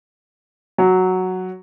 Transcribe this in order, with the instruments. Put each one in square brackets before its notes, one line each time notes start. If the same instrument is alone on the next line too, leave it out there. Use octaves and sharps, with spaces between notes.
[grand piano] F#3